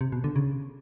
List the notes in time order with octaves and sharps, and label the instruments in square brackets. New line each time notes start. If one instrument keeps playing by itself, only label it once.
[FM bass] C3
B2
D3
C#3